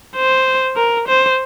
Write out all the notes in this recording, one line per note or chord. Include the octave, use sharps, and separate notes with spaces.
C5
A#4
C5